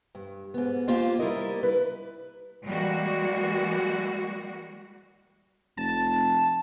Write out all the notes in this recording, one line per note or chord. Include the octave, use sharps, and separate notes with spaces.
G2
G#2 B3
A#3 F4 G4 C5 F5
G3 E4 A#4 D#5
B4
E3 G3 G#3 A#3 F#4
F1 A5